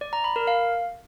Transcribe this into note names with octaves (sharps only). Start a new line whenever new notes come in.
D5
A#5
B5
A#4
F5